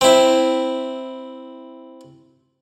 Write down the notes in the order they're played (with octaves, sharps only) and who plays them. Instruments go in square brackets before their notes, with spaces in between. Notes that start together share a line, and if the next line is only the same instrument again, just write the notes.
[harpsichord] C4 E4